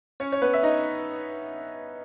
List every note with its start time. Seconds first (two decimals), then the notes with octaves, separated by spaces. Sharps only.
0.20 C#4 C#5
0.32 C#5
0.42 B3 B4
0.54 E5
0.63 D#4 D#5